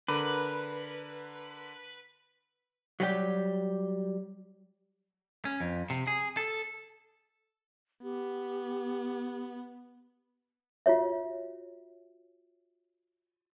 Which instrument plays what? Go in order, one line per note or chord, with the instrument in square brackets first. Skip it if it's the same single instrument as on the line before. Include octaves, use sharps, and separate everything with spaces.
[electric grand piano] D3 A#4 D6 [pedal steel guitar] B4
[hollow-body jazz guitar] F#3 G3 G4
[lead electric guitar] C#4
F2
C3
G#4
A4
[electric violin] B3 [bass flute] G4
[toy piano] F4 F#4 C#5 E5